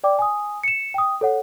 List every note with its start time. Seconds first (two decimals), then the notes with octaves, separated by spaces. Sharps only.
0.04 D5 G5 D6
0.19 G#5 D#6
0.64 C#7 E7
0.94 G5 D#6
1.21 A4 C#5 F#5